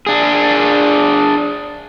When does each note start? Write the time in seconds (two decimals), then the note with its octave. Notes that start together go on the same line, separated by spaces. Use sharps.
0.06 D4 G#4